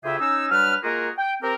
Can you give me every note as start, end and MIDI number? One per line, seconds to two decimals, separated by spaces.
0.04 0.17 38
0.04 0.17 49
0.04 0.17 65
0.04 0.17 67
0.04 0.17 68
0.04 0.17 76
0.20 0.50 61
0.20 0.50 63
0.20 0.50 88
0.51 0.75 54
0.51 0.75 55
0.51 0.75 62
0.51 0.75 71
0.51 0.75 89
0.84 1.10 56
0.84 1.10 58
0.84 1.10 65
0.84 1.10 66
0.84 1.10 68
0.84 1.10 70
1.18 1.34 79
1.42 1.54 60
1.42 1.54 67
1.42 1.54 70